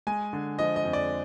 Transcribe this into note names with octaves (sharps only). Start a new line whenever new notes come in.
G#3 G#5
D3
F3 D#5
D#5
F2
D5